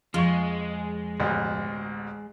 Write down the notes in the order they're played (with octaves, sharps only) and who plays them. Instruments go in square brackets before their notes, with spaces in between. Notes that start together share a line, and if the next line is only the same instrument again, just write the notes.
[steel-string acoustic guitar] F2 [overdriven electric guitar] G#3 [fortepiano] F4 C#6
[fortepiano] A1 D2 B2